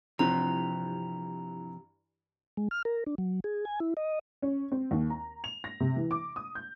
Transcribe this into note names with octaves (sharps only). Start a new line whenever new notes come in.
G2 C3 E3 F3 A#5 F#6
G#3
F6
A#4
D4
F#3
G#4
G#5
E4
D#5
C#4
C4
D#2
A#5
F7
A#6
C3
E3
D6
D#6
G6